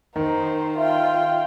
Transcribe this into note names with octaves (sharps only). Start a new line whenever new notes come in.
D#3 D#4 C5
F4 E5 G5